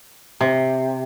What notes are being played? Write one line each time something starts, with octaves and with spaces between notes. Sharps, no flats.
C3